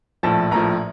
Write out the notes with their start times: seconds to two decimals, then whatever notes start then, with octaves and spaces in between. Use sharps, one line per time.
0.23 A#1 A2 F3 A5
0.51 A#1 A2 F3 A#5